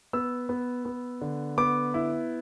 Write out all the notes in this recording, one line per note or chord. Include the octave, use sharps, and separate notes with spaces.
B3 E6
B3
B3
D3
B3 D6
E4